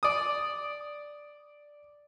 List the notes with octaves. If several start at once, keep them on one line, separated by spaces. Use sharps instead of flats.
D5 D#6